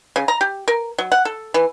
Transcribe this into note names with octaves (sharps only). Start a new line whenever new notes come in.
C#3
A#5
G4
A#4
F#3
F#5
A4
E3